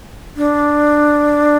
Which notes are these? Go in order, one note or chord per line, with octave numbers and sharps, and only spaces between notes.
D4